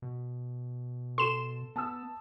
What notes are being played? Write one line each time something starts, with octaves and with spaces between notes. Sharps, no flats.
B2
A4 C6 E7
B3 A5 D#6 E6